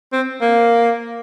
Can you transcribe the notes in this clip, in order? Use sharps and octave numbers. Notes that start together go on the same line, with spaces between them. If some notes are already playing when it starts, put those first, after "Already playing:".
C4
A#3